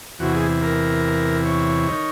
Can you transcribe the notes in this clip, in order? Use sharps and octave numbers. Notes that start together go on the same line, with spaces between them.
E2 C3 E3 F#4
G#4
A#4
C#5
D#3